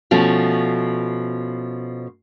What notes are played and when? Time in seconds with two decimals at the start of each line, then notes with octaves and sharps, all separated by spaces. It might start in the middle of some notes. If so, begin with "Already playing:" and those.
0.11 B2 F3 A3 C#4